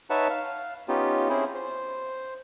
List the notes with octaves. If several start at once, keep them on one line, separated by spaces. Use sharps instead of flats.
D#4 B4 C#5 E5 F#5 A5
F5
B3 C#4 D#4 F4 G4
C4 C#4 E4 G#4 C5
C5